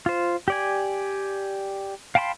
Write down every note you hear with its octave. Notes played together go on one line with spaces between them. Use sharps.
F4 C5
G4 D5 G#5
F5 G5 A5 B5 C6